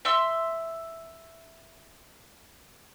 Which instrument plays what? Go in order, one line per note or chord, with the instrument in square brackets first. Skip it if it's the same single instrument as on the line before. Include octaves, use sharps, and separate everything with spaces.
[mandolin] E5 C6 E6